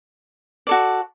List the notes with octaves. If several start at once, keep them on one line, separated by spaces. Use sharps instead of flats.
F#4 A4 D5